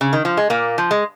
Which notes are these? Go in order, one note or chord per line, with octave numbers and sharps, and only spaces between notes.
C#3
D#3
F3
G#3
A#2 A#3
F3
G#3